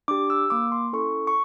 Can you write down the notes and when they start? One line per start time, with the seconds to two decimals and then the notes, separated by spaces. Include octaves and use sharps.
0.08 D4 G4 D6
0.30 E6
0.50 A#3 D6
0.72 C6
0.93 C#4 E4 A4 C#6
1.27 C#6